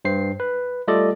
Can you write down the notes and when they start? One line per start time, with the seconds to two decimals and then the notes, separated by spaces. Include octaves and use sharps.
0.05 G2 C5 C7
0.40 B4
0.88 G3 A3 F4 A4 D5 D#5